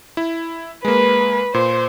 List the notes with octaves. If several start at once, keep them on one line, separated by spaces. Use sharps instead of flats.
E4
G#3 A#3 B4
A#2 C5